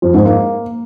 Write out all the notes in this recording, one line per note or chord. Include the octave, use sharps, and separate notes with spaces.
F2
G#2
A#3